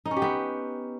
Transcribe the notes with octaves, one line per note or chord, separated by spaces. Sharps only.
D#4
C#4
G4
B3